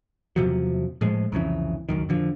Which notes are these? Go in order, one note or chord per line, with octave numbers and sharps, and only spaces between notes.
E2 C3 F3 F#3
A2 F3 G#3
C2 F2 C#3 E3
C#2 F#2 D#3
F2 D3 F3